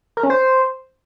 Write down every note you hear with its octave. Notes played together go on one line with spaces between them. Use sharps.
A#4
C#4
C5